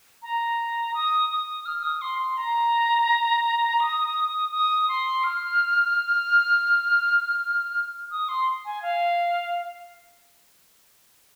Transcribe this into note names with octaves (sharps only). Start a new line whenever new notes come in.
A#5
D#6
D#6
F6
D#6
C6
C6
A#5
D#6
D#6
C6
F6
D#6
C6
G#5
F5